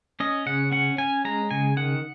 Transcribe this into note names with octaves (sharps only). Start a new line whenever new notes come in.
C#4 D#5
C#3 F#5
C#4 F#5
C#4 G#5
G#3 A#5
C#3 G#5
D#3 F#5